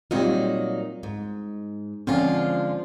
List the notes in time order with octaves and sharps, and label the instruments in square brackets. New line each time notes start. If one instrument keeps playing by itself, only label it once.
[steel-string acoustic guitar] A#2 F#3 D#4 [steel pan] G3 C4 F4
[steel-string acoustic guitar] G#2
[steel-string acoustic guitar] D3 G#3 F4 [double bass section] F3 [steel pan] C4 C#4